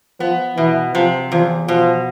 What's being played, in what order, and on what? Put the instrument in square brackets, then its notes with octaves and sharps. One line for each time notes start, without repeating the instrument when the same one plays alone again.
[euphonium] F3 [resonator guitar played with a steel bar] B3
[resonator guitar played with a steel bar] B2 [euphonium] E3
[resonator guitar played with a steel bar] C3 [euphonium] F3
[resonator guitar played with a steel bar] E2 [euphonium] F3
[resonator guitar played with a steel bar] B2 [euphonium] F3